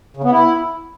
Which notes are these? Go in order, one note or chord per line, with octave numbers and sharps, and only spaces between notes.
C#3
B3
E4